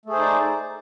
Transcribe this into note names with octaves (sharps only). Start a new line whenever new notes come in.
A3 D#4 G#4 C5 D5